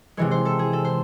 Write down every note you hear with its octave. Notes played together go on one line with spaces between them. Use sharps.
C3 E3 G#3 C#5
C5
A4
G#4
A4
C5